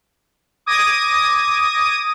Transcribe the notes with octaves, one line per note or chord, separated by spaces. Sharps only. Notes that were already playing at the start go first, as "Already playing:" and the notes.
D6 D#6 G#6 A#6 D#7